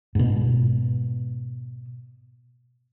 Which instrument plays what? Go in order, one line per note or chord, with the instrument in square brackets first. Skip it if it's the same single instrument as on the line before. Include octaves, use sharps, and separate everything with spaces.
[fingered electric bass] G#2 B2